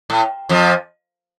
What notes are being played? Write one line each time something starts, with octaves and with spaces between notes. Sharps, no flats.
A2
F2 F3